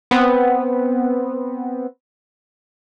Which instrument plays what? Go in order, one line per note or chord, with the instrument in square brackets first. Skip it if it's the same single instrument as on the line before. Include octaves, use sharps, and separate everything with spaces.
[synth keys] B3 C4